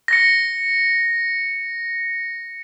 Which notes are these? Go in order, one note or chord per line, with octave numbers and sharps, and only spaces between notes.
A#6 C#7